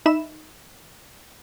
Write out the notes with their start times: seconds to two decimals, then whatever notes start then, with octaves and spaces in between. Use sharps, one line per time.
0.06 D#4 E5 B5 E7